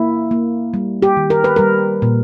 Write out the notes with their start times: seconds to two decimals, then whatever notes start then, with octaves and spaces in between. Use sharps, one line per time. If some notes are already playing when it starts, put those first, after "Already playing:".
Already playing: A#3 E4
0.31 A#3
0.74 G3
1.02 G4
1.17 D#3
1.30 A#4
1.44 B4
1.56 G3 A#4
2.02 A#2